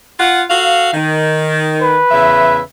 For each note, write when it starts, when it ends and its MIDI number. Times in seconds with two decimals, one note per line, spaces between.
0.19 0.42 65
0.19 0.42 78
0.50 0.90 66
0.50 0.90 69
0.50 0.90 77
0.94 1.97 51
1.82 2.61 71
2.11 2.60 40
2.11 2.60 49
2.11 2.60 76